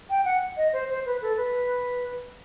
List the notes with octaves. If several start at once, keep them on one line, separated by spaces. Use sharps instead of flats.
G5
F#5
D#5
C5
C5
B4
A4
B4